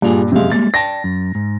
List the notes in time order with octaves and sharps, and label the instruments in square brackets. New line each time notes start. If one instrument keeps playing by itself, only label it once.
[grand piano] G2 A#2 [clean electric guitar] G3 F4 G#4
[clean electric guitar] F#2 F5 [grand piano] C3 G#3
[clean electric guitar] G3 G#3 A#3 [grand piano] A6
[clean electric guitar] D5 G5 A5 [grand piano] A#6
[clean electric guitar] F#2
G#2